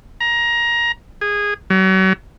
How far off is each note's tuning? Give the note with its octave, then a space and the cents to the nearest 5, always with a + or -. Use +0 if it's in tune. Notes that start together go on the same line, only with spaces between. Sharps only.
A#5 +20
G#4 -15
F#3 +40